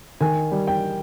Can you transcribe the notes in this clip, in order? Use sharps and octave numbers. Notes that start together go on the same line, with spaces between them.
D#3 G#5
G3
G5